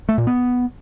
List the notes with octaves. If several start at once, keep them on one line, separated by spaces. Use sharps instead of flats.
A3
A#2
B3